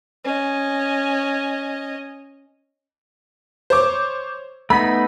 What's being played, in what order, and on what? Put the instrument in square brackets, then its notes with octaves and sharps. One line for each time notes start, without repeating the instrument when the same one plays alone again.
[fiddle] C#4 D#5
[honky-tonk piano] C5 C#5 D6
[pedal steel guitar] A3 B3 D#4 [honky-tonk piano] B5